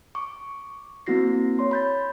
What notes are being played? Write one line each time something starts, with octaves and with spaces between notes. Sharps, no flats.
C#6 D6
A#3 C4 E4 F#4 A#6 C7
C#5 C6
B5 G6 A6